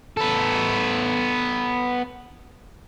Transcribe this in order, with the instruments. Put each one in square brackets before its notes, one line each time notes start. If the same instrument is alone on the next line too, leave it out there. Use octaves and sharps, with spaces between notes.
[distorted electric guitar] B3 A4